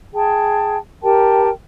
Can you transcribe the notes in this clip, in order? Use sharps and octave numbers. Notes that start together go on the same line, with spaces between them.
G#4 G5 A5
G4 A#4 G5 A5